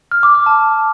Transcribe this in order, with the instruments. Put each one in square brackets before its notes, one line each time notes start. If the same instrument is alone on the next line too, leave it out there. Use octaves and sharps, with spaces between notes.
[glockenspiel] F6
D6
F6
A5